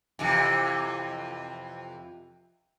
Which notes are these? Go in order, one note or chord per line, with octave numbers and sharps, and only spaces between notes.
F2 C3 E3